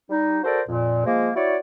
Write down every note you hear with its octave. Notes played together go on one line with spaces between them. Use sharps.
G3 D#4
F#4 A4 A#4 C5 D5
F2 A#2
F3 G#3 A#3
E4 F#4 C#5 D5